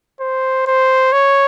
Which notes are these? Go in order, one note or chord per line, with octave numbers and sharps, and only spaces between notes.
C5
C5
C#5